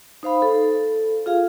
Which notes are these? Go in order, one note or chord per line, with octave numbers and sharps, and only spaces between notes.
D#4 C5 F5 B5
A4
F4 G#4 F5